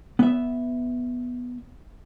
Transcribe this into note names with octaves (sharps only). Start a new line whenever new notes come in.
B3 E5